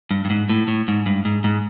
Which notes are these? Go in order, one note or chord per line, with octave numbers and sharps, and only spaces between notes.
G2
G2
G#2
A2
A2
G#2
G2
G#2
G#2